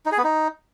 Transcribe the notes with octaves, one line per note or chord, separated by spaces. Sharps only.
D#4
G#4
B3
D#4